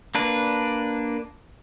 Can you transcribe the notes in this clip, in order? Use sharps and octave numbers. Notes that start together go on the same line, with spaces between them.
A#3 D4 B4